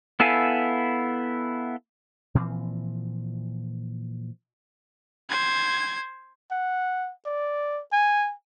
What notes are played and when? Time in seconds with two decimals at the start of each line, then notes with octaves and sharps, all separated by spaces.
0.20 B3 E4 A4 F5 G#5
2.35 A#2 E3 F3 C4
5.30 C5 G#6
6.51 F#5
7.26 D5
7.93 G#5